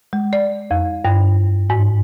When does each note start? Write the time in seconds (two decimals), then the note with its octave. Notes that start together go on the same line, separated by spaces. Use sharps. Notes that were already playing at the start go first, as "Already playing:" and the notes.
0.13 G#3
0.33 D5
0.71 F2
1.05 G2
1.70 G#2